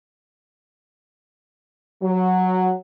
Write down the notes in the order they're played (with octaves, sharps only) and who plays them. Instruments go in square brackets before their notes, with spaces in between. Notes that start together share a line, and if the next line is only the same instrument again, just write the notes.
[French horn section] F#3